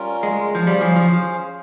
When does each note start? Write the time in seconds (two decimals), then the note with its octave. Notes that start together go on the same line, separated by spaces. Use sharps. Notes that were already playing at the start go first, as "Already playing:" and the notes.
Already playing: G3 C#4 F4 A#4
0.23 G#3
0.55 F3
0.67 G3 C#4 G#4 C5 F5
0.81 F3
0.96 F3